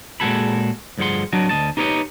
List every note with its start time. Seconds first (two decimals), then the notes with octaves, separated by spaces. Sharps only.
0.20 A#2 G#3 F#4 G#4 A4 B5
0.98 D2 G2 F3 G#4 F#5 C6
1.33 F#3 D4 F#4 D#5
1.49 D2 D#5 A5
1.77 D#4 G4 B4 C#5 D#5